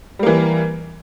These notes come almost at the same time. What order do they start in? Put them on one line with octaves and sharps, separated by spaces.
G3 A#3 E3